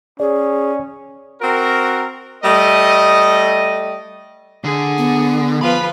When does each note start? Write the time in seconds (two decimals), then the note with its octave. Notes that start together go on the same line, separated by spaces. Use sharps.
0.20 C#4 G#4 D5
1.41 C4 F#4 A#4
2.43 G3 A3 D#5
4.64 D3 G#4
4.98 B3
5.61 F3 F4 B4 B5